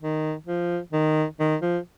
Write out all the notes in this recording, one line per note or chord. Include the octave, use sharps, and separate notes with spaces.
D#3
F3
D#3
D#3
F3